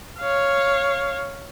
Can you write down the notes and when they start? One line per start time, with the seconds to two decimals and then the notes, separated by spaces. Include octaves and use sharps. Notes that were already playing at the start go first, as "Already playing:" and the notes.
0.19 C#5 F5